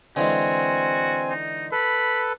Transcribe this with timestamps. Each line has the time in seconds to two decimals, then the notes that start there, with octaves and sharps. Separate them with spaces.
0.16 D3 E3 G#3 C4 F#4 G#5
1.30 D#4
1.72 A4 B4 B5